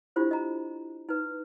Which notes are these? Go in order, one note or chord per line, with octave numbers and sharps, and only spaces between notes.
D4 E4 F4 G4 C5
D#5 A#5
D#4 B4